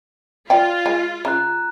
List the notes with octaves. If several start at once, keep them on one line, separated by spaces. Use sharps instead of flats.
F4 D5 G5
G#3
C#3 A#5 F#6